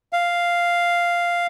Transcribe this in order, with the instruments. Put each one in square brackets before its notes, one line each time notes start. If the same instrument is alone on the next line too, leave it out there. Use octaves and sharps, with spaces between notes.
[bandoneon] F5